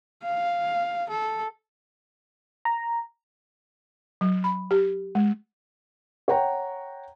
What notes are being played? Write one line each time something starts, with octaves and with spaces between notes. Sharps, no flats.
F5
A4
A#5
F#3
B5
G4
G#3
C#5 F#5 G5 A#5